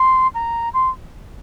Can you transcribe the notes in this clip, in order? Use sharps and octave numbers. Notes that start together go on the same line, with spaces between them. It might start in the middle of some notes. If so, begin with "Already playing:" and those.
Already playing: C6
A#5
C6